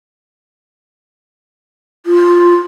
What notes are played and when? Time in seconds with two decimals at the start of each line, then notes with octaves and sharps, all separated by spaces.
2.06 F4